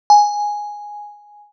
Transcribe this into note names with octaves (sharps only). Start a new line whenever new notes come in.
G#5